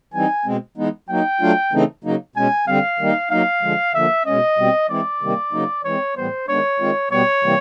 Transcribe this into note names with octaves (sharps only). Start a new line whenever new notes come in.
E3 G3 C4 D#4 G#5
B2 G#3 C4
E3 G#3 B3 D#4
F#3 A#3 D#4 G5
F#3 A3 D4 F4
C#3 E3 A3 C4 D#4
C#3 F#3 A#3 D#4
B2 G#3 C#4 G#5
D3 G3 C4 F5
D#3 G3 A#3 D#4
F#3 A#3 D#4 F5
D3 F3 G#3
D3 F3 A#3 E5
B2 G#3 C#4 D#5
B2 G3 C4
E3 G#3 C4 E4 D5
C3 D#3 G3 A#3
C#3 F#3 A#3 D#4
E3 G#3 C4 C#5
A2 E3 G3 B3 C5
D#3 G#3 B3 D4 C#5
D#3 G#3 C4 F4
B2 G3 B3 C#5
C3 E3 G3 A#3